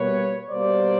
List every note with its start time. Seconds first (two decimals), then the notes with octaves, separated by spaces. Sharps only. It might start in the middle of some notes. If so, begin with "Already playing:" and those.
Already playing: B2 G3 A#3 B4 C#5
0.50 B2 G3 A#3 C5 D5